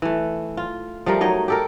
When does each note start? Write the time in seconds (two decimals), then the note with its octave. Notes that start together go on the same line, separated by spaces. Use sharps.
0.02 E3 A3
0.57 F4
1.06 F3 G3 A3 A#4
1.21 F#3 D#4 C#5 D#5
1.48 G4 A4 A#4